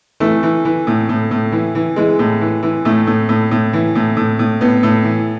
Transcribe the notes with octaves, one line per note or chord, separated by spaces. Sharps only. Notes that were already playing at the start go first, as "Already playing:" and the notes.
E3 A3
E3
E3
A2
A2
A2
E3
E3
E3 G#3
A2
E3
E3
A2 A3
A2
A2
A2
E3
A2
A2
A2
A2 B3
A2
E3